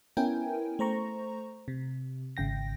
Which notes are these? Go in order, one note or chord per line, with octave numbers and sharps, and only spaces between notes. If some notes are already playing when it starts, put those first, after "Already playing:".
B3 C#4 E4 A#4 G5 G#5
A3 C5 A#5 C#6
C3
G#1 C#3 G5 A#6